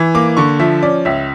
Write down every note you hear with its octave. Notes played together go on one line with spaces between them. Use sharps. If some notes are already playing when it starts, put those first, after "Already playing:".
Already playing: E3
A#3 D6
D3 C#6
F3 E5
C#4 D5
C#2 E5